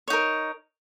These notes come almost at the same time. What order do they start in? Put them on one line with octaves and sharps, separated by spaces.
C#5 D#4 A#4